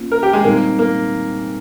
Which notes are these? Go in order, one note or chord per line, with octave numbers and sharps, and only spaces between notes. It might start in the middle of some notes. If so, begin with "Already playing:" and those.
Already playing: A#3 C#4 F4
A#4
G4
G#3
A#2 G3 A#3 C4 D#4
A#3